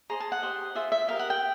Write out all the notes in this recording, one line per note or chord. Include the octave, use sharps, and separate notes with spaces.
G#4 C5 D#5 A#5
A5
F#5
G4 C5 D#5
F4 G#4 C5 E5
E5
G4 A#4 D#5 F5
F#5
G5